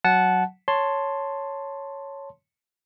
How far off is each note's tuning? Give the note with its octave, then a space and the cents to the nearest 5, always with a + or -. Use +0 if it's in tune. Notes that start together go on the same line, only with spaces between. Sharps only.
F#3 +0 F#5 +0 A5 -20
C#5 +0 A5 +5 C6 +0